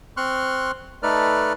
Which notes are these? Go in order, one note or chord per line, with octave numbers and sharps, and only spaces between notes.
C4 C6 C#6 F6 F#6
A3 D#4 A4 B4 D5 F6